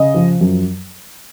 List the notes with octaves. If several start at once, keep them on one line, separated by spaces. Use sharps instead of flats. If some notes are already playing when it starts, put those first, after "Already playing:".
Already playing: C#3 D#5
F3
F#2